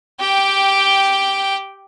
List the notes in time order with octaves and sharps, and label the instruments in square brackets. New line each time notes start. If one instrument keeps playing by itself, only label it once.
[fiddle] G4 G5